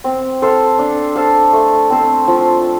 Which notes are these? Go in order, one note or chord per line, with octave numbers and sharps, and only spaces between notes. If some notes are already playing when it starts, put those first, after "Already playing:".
C4
A4 C5 F5
D4
A4 C5 F5
A3
C4 A4 C5
F3